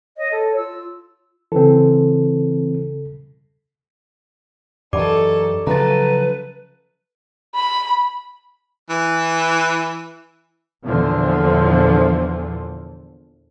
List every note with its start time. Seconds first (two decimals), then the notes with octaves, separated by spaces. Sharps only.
0.17 C#5 D#5
0.32 A4
0.56 F4 E6
1.52 C#3 E3 C4 A4
4.93 F#2 E3 D#4 G4 A4 D5 D6
5.67 C#3 F3 F#3 A3 B4 A#5 A6
7.55 B5
8.89 E3
10.85 E2 A#2 D3 E3 F3